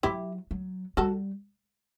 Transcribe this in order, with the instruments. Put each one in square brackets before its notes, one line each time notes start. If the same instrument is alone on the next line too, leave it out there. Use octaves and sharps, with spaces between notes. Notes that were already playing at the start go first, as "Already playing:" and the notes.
[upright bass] F#3 [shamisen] E4 G4
[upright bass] F#3
[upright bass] G3 [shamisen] F#4 A4